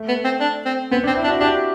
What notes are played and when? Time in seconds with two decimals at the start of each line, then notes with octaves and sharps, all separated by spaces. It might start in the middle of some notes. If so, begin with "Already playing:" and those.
Already playing: A3
0.08 B3
0.25 C4
0.41 D4
0.65 C4
0.91 B3 C4
1.04 D4
1.07 C4
1.15 E4
1.24 D4
1.28 F#4
1.40 D4 G4